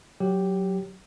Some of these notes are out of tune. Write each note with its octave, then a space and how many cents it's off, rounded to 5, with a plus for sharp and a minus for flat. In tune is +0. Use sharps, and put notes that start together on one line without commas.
F#3 +0 G4 +0